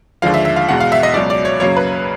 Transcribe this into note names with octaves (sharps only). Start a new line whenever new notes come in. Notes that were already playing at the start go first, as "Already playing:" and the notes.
D#2 D3 F3 G#3 F5
E5
E5
F5
E2 B2 G#3 F#5
F5
E5
D#5
C#2 B2 F#3 D5
D5
C#5
F#2 C#3 F#3 A#3 C#5
B4